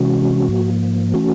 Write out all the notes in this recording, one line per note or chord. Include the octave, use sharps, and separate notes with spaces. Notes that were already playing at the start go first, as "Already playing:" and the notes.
Already playing: C3 E3 G#3 C#4 F#4
G#2 F3 A#3
E3 A3 C#4 F#4